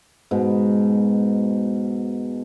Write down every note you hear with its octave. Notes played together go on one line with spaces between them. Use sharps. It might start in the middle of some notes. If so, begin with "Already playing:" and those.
G#2 B2